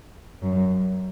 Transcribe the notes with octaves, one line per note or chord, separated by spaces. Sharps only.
F#2